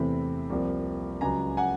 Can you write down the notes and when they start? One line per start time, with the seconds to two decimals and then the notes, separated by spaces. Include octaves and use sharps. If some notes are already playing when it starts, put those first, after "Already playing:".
Already playing: E2 C3 E3 A3 C4 B5
0.50 C2 C3 F3 A#3
1.21 C#2 C#3 F#3 G#5 A#5
1.57 F#5 G#5